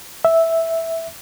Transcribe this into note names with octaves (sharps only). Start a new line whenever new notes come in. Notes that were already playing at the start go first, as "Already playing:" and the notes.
E5